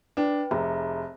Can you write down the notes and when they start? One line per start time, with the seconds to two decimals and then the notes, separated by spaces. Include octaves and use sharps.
0.17 D4 B4 G5
0.51 F1 G#4 E5 A#5